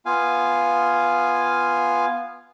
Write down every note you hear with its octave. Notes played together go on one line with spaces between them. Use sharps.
B3 F4 F5 G#5